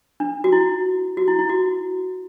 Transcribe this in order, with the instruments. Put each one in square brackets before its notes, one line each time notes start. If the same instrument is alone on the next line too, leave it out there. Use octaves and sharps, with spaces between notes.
[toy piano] D4
F#4
E4
F#4
E4
E4
F#4